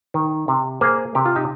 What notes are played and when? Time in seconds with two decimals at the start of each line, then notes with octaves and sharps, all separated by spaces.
0.14 D#3
0.48 C3
0.81 A#3 G#4 C5
1.15 C3 G4
1.25 F4
1.36 D#4 G4